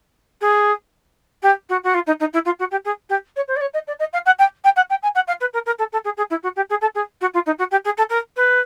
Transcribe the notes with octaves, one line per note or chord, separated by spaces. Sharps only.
G#4
G4
F#4
F#4
F4
D#4
D#4
E4
F4
F#4
G4
G#4
G4
C#5
C5
D5
C#5
D#5
D5
D#5
F5
F#5
G5
G5
F#5
G5
G#5
F#5
F5
B4
A#4
A#4
A4
A4
G#4
G#4
E4
F#4
G4
G#4
A4
G#4
F#4
F4
D#4
F#4
G4
G#4
A4
A#4
B4